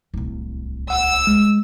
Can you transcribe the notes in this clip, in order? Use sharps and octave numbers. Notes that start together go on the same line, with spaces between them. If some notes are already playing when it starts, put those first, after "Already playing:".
D1 C2
F#5 E6
G#3